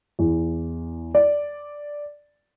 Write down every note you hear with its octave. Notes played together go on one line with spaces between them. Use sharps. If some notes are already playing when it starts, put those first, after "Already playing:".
E2
D5